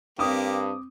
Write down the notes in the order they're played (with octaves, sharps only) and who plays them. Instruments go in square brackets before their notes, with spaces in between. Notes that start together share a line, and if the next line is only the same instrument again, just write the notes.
[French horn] G2 [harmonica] A#3 G4 [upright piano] C4 D6 D#6